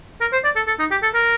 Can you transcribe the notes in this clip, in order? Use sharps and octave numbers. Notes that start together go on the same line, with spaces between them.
A#4
C5
D5
A4
A4
D#4
G4
A4
A#4